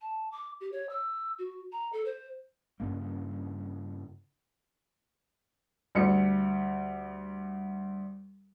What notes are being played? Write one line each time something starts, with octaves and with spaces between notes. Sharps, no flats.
A5
D6
G4
C#5
E6
F#4
A#5
A4
C5
G2 C#3 A#3
D2 G3 C#7